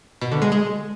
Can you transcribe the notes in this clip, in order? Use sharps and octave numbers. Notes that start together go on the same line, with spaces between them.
B2
D3
G#3
G#3